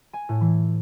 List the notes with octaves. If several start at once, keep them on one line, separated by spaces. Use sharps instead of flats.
G#5
A2
E3